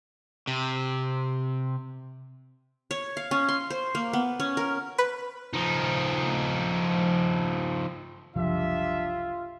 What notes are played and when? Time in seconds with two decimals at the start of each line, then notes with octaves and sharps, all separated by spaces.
0.47 C3
2.91 C#5
3.17 F5
3.31 C#4
3.49 C6
3.70 C5
3.95 A#3
4.13 B3
4.40 C#4
4.57 A#4
4.98 B4
5.53 F3 D#4
8.36 F#1 C2 F3 D4 F4 G4 E5